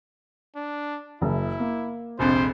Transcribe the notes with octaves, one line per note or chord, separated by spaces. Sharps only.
D4
F#1 E4
A#3
F1 A#1 F2 C5